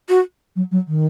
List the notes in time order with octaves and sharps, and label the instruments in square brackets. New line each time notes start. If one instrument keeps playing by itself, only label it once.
[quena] F#4
[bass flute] F#3
F#3
D#3